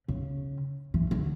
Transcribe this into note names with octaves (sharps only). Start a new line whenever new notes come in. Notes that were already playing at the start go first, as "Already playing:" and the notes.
C#3
E3
D3